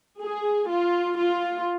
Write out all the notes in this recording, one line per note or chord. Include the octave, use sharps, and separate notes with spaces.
G#4
F4
F4